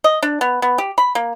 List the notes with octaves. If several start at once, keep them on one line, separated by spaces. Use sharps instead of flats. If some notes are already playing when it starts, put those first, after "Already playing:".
D#5
D4
B3
B3
G4
B5
A#3